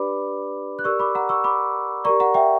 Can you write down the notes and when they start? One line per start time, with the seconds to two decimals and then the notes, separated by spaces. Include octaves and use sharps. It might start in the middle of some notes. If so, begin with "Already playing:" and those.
Already playing: D4 G4 B4 D5 B5 D6
0.79 F#6
0.84 G4 A#4 D5 C#6 E6
0.99 B5 D6
1.15 F#5 A#5
1.29 C#6 E6
1.44 B5 D6
2.04 G4 A#4 D5 A#5 C#6
2.20 F#5 A#5
2.34 E5 G5